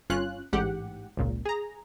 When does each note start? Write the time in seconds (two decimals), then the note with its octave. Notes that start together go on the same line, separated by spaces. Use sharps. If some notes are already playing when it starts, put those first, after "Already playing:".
0.10 G1 C#4 F4 F#6
0.53 A1 G#2 G4 F#5
1.17 G#1 C#2 A#2
1.45 G#4 A#5